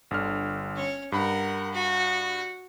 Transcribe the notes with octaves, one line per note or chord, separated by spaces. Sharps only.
G1 D3 F6
C#4 C#5
G2 A#4 F#5 B5
F#4